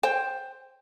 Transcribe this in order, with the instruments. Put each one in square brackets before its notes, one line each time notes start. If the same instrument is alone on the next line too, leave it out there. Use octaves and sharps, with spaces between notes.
[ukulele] C5 G5